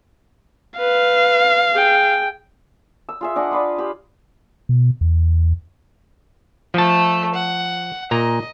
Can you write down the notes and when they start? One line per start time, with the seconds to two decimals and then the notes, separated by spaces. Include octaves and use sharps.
0.79 B4 F5
1.73 G#4 G5
3.09 E6
3.21 F4 G#4 E5
3.36 D4 D#5 F#5 G#5
3.51 F4 B4 D5
3.78 G4 B5
4.69 B2
5.01 E2
6.74 F3 A3 A4 A5
7.34 F#5
8.11 A#2 D#5 A#5